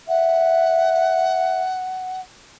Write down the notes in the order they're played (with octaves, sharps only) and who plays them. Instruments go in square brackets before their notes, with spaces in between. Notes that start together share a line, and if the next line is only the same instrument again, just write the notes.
[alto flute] E5 [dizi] F#5